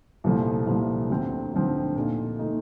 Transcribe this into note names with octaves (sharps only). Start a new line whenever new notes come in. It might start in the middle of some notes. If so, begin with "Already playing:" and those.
C2 A#2 F3 A3
C2 A#2 F3 A3
D2 D3 F3 C4
D2 D3 F3 C4
A#2 A3 D#4
A#2 A3 D#4